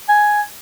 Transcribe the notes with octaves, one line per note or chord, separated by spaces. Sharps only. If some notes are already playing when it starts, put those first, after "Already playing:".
G#5